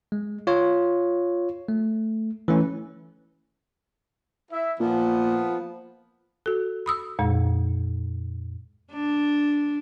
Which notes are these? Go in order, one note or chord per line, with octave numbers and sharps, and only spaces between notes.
G#3
F4 C#5
A3
E3 A3 C#4
E4 E5
A#2 F3 B3
F#4 A4
B5 D#6 E6
F2 A#2 G#3
D4